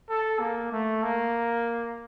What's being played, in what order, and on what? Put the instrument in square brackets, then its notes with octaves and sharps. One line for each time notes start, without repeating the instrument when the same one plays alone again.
[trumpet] A4
A#3
A3
A#3